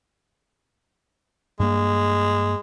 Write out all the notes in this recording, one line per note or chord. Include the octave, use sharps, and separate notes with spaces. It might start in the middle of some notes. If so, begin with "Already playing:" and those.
G2 G#3 A#3